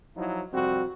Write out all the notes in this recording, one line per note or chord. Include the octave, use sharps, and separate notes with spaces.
F3 F#3 D#4 E4
F2 C3 G3 C4 F#4